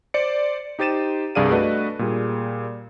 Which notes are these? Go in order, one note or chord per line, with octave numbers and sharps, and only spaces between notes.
C5 D5 C#7
D#4 G4 C5 A6 D#7 E7
C2 G2 G#4 D5 F5 D#7
A3 D4 F#4 B4 D#5
A#2 G3 G#4